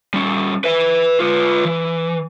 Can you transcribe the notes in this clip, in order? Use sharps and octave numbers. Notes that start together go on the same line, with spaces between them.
G3 C#4
B4 E5
F4 B4
E3